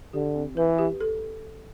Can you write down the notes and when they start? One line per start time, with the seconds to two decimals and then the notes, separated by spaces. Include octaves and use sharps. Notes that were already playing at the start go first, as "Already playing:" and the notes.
0.13 D3 G4
0.35 C4
0.57 E3 B4
0.79 G4
1.00 A4